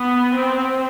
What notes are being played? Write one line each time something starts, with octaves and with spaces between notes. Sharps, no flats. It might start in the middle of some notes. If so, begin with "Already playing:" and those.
Already playing: B3
C4